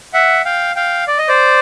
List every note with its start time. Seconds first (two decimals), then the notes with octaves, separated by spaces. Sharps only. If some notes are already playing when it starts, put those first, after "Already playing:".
0.13 E5 F#5
0.45 F5 G5
0.76 F5 G5
1.08 D5
1.18 D#5
1.28 C5 D5